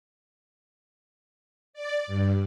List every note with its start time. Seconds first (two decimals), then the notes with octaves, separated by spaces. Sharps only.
1.73 D5
2.07 G2